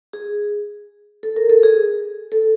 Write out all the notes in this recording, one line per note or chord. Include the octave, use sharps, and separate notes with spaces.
G#4
A4
A#4
A4
G#4
A4